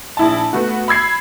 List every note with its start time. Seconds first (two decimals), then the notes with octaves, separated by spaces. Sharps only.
0.17 A#1 E4 A5
0.53 A3 B3 F#4
0.88 B5 E6 G#6 C7